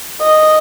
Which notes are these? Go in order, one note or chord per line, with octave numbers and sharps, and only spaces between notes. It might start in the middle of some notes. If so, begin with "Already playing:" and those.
D#5